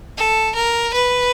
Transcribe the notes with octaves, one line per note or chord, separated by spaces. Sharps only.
A4
A#4
B4